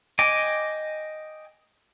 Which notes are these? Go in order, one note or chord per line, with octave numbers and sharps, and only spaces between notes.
D#5 G5 G#5 D6